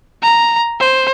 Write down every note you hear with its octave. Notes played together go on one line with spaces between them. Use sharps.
A#5
C5